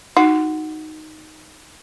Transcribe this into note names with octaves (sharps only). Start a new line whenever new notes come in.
D#4 F#4